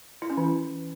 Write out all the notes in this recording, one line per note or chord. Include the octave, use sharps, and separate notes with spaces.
E4
C#4
E3